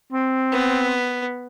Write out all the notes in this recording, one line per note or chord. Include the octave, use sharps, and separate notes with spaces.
C4
B3